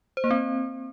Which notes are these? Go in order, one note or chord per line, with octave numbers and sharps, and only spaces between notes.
C5
A#3
C4